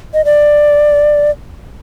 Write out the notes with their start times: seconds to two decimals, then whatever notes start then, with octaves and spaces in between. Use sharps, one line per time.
0.14 D#5
0.25 D5